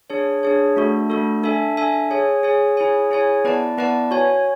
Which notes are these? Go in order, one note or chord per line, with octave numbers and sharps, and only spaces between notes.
D4 G#4 C#5
D4 G#4 C#5
A3 D4 F#4 A4
A3 D4 F#4 A4
D4 A4 E5 G#5
D4 A4 E5 G#5
G#4 C#5 G#5
G#4 C#5 G#5
E4 G#4 C#5 G#5
E4 G#4 C#5 G#5
B3 E4 B4 D5 A5
B3 E4 B4 D5 A5
F#4 C#5 G#5